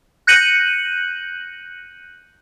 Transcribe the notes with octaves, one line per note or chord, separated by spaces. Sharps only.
F#6 G6 A#6 C#7 D#7 F#7